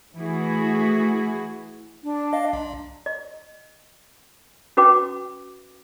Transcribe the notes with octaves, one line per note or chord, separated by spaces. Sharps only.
E3 A3 E4 F#4 G#4
D4
D#5 F5
B1
D#5
C#4 F#4 B4 G5 D6